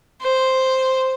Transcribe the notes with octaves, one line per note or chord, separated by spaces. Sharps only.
C5